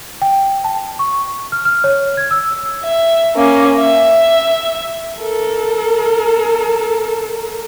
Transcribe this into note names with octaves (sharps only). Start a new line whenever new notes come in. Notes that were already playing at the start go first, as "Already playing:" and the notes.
G5
A5
C#6
F6
F6
C#5
G#6
E6
E5
A#3 C#4
E5
A4 A#4